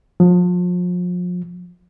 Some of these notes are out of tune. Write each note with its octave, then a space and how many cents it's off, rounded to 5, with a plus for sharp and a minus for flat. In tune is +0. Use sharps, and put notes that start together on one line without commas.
F3 +35